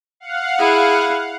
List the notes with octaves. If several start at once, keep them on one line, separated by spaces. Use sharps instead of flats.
F5 F#5
E4 G#4